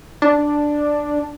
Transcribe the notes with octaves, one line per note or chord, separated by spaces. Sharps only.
D4